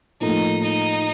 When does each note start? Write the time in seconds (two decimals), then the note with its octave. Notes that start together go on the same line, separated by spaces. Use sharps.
0.21 A2 F3 A#3 D#4 F4 A4
0.63 D#4